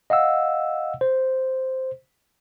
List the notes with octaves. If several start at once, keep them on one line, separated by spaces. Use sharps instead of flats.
D#5 F5 F#5 E6
C5